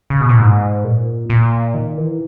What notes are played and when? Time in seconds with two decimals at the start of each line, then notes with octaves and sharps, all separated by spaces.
0.10 C#3
0.21 B2
0.29 A#2
0.39 G#2
0.84 A#2
1.30 A#2
1.74 D#3
1.97 E3